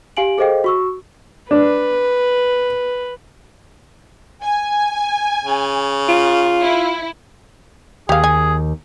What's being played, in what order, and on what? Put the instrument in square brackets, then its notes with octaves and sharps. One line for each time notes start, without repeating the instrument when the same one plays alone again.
[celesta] G4 F5 G#5 D7 F#7
G#4 A4 C5 D#5 F5 G5
F#4 C#6 E6
[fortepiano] D4 [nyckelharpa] B4
[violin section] G#5
[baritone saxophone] C#3
[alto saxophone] F4
[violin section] E4
[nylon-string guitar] D#2 [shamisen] G4 F5 [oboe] G#4
[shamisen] G#5